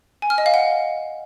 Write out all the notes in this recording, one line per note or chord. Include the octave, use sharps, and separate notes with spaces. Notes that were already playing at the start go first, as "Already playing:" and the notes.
G#5
F6
D#5
F5
F#5